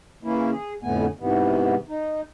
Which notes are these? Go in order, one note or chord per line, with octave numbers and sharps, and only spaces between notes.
C#3 E3 A#3 C#4 E4
G#4
F2 A2 D3 A3 B3 G#5
G#2 C3 E3 B3
D#4